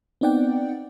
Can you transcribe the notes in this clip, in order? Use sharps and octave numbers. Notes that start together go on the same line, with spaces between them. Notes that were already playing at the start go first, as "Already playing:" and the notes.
B3 C4 D#4 D5 F#5 G5